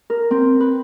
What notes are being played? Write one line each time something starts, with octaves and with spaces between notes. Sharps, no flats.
A#4
C4
B4